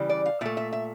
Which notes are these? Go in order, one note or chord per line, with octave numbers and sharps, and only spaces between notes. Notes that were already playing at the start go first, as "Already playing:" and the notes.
Already playing: C#3 E3 G3
D5
F5
A#2 A3 E5
E5
E5